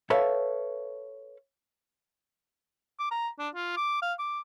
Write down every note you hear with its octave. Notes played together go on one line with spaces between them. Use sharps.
A4 B4 C#5 E5 F5 A5
D6
A#5
D4
F4
D6
F5
D6